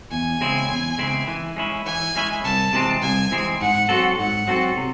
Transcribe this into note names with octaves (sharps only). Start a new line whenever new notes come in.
E2 G#5
C#3 G#3 C4 E4
E2
C#3 G#3 C4 E4
E3
G#3 C#4 E4
E3 G#5
G#3 C#4 E4
C2 A5
C3 E3 G#3 C4
C2 G#5
C3 E3 G#3 C4
G#2 F#5
F#3 C4 F#4 A4
G#2 F#5
F#3 C4 F#4 A4
C3